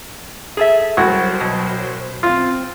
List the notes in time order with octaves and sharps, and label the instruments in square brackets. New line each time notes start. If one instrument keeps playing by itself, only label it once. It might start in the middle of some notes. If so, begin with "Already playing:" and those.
[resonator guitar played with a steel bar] G#4 A4 E5
[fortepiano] C2 F#4 [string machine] F#3 C5
[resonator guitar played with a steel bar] B2
[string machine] C4 [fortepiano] F4